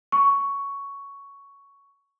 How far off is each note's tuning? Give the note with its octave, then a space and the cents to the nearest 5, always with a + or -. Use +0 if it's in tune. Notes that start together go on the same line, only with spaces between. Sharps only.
C#6 +10